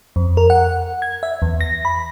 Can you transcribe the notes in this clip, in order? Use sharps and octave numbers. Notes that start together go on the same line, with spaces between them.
F2
A#4
F#5
G#6
E5
E2
A#6
B5